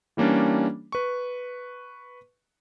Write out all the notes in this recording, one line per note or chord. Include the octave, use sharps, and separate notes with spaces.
E3 G3 A#3 C#4 D4
B4 C#6